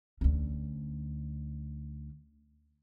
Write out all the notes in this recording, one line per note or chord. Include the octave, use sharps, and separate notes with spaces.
D2 C#4